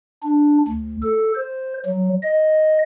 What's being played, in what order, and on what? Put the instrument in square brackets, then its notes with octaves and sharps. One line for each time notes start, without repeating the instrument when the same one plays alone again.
[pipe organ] D4
D2
A4
C5
F#3
D#5